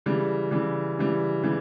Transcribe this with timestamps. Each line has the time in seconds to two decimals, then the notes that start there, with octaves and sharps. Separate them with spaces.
0.06 C#3 E3 G3
0.51 C#3 E3 G3
0.97 C#3 E3 G3
1.43 C#3 E3 G3